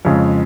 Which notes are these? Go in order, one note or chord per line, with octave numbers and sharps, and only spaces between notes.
F2 C#3 G#3